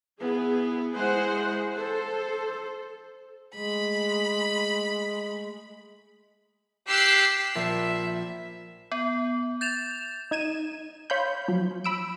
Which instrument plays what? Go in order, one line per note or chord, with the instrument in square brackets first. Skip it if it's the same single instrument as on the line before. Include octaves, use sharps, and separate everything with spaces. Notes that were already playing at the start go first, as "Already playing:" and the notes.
[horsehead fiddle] B3 E4 [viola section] G#4
[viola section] G#3 C5 F#5 [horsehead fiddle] E4 G#4
[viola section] A4 [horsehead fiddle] C5
[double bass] G#3 A3 [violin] B5
[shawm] G4 [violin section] E6 F#6 C7
[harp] A#1 B6 C7 [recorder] E5
[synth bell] B3
G6 A6 E7 F7
[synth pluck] D#4 G#6 D#7 E7
C#5 F5 B5 C6 G6
F3 F#3
B5 E6 D7